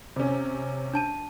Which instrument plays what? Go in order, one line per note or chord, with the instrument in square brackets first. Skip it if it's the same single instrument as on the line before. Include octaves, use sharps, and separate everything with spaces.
[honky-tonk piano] C3 C#4
[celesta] D4 A5 D#7